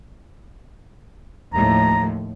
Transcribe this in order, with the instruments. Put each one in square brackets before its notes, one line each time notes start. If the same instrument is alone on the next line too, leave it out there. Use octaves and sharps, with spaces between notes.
[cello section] D#2 A2 F3 [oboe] A#5